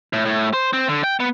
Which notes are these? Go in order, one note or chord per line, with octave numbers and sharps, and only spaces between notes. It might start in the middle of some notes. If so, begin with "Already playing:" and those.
A2
A2
C5
C4
D3
G5
B3